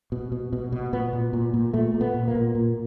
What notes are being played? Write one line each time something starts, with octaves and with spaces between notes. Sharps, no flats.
B2
B2
B2
B2
A#2 B3
A#2
A#2
A#2
A#2 A3
A#2
B3
A#2
A#3
A#2
A#2